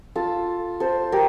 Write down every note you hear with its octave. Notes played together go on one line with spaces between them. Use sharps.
F4 A4
A4 C5
G4 A#4